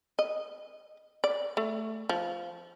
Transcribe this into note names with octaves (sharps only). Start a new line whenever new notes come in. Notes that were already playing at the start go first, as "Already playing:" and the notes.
D#5
D5
A3
F3